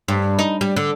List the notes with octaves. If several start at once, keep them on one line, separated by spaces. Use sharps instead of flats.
G2
D#4
G3
D3